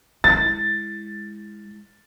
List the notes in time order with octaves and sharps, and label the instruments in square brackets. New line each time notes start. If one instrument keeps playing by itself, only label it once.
[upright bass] G#3 E4 [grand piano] A6